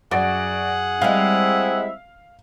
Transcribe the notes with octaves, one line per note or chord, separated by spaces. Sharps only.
F#2 F#4 G#4 D5 F#5
G3 G#3 C4 E4 E5 F5